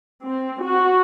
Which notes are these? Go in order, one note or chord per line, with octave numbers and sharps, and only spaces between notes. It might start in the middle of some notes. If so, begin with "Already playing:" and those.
C4
F#4